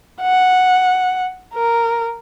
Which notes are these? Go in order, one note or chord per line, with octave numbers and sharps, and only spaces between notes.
F#5
A#4